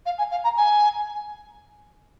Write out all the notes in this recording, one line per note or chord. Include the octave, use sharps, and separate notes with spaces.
F5
G#5
F5
A#5
G#5